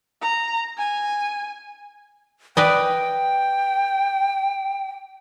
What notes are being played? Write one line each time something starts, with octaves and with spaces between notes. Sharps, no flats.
A#5
G#5
B4 D5 D#5 G5